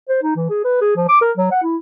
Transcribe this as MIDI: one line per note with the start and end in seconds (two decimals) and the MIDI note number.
0.09 0.22 72
0.23 0.34 63
0.36 0.47 52
0.50 0.64 68
0.64 0.79 71
0.81 0.93 68
0.96 1.07 53
1.08 1.17 86
1.21 1.32 70
1.37 1.48 54
1.51 1.61 78
1.63 1.77 64